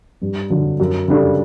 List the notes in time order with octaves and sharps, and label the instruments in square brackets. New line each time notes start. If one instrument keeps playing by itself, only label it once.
[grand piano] G2
D3 F#3
F#2
C#3 G3 D4 A4